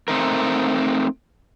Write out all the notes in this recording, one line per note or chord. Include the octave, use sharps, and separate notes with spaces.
A3 C4 D#4 A#4